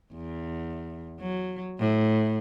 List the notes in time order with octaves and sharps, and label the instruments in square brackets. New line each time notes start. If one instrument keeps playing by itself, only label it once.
[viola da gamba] E2
F#3
A2